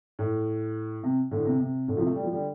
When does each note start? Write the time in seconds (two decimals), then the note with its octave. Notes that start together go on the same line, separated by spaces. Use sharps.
0.19 A2
1.03 C3
1.31 A2 D3
1.46 C3
1.59 C3
1.88 A2 D3
1.97 C3 F3
2.07 A3
2.15 G3
2.23 F3
2.32 D3 G3